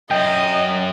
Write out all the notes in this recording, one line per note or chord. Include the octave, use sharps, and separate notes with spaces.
F#2 D#5 G5